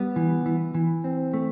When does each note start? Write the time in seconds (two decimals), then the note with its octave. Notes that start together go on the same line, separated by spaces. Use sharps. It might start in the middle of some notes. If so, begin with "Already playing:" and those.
Already playing: G3 B3
0.16 E3
0.46 E3
0.75 E3
1.04 C4
1.34 A3